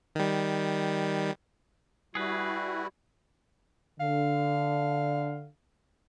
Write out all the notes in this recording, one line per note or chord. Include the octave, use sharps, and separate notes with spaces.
D#3 G3
G3 E4 F#4 G#4 B4
D3 F5